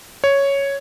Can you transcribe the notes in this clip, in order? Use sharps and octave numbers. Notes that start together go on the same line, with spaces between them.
C#5